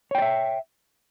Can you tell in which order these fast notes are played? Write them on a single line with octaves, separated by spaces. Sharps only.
C#5 G5 D5 E5